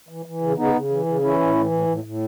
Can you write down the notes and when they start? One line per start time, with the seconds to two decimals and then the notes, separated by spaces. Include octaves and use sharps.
0.09 E3
0.26 E3
0.41 C#3
0.58 C#3 B3 D#4
0.74 C#3
0.90 E3
1.06 C#3
1.22 E3 C#4 E4
1.39 A2
1.55 E3
1.71 A2
1.88 A2
2.04 A2